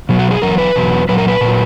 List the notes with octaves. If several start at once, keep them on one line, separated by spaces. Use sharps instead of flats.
B2 F#3
F#4
G#4
E2 B2 F#3 A#4
B4
E2 B2 F#3
A#2 F#3 B4
A#4
B4
A#2 F#3